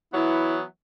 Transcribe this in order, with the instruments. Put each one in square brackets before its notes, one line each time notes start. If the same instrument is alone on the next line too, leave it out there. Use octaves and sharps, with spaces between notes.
[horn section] E3 F#3 B3 [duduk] E4